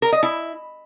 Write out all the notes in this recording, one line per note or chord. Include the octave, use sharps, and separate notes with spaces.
A#4
D#5
E4